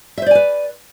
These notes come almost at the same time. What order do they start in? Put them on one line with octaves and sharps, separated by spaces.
E5 C5 D5 G#5 B4